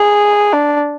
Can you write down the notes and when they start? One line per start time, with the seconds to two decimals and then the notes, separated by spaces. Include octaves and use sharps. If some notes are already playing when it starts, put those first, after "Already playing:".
Already playing: G#4
0.53 D4